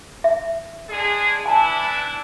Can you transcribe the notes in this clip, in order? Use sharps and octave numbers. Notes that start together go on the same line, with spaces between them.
E5
G#3 D4 G#4
B3 D4 E4 G#5 A5